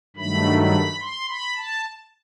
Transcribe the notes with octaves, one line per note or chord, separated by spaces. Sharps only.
G2 D#3 F#3 A3 B5
B5
C6
B5
A5